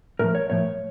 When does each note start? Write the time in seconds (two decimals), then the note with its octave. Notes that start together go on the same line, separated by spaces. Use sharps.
0.19 A2 F3 A#4
0.35 C#5
0.50 A2 F3 C#5